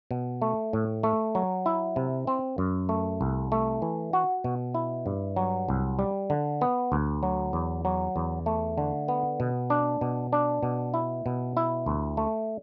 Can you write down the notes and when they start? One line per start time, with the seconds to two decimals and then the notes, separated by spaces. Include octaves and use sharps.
0.11 B2
0.42 A3
0.73 A2
1.03 A3
1.35 F#3
1.66 E4
1.96 C3
2.27 C4
2.58 F#2
2.89 A3
3.21 C2
3.52 A3
3.82 E3
4.13 F#4
4.44 B2
4.75 E4
5.06 G2
5.36 F#3
5.69 C2
5.99 G3
6.30 D3
6.61 B3
6.92 D2
7.23 F#3
7.53 E2
7.85 F#3
8.16 E2
8.46 A3
8.78 D3
9.08 B3
9.40 B2
9.70 D4
10.01 B2
10.33 D4
10.63 B2
10.94 E4
11.26 B2
11.57 E4
11.86 D2
12.17 A3